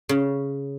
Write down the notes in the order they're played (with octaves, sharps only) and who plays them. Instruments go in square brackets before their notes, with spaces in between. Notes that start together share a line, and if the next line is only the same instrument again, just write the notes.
[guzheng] C#3